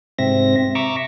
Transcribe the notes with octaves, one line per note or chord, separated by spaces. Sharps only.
G#2 C3 C4 E5 A#6
E5 A#5 C#6 D6 E6